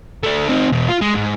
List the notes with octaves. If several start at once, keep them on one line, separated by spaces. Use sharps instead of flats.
A3 D4
C4 D#4
E2 B2
F4
G#3
G#2